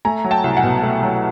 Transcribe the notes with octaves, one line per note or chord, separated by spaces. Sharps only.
A3 G#5 A#5
F#3
G5 A5
C2
F#5 G#5
B2
A3
F#3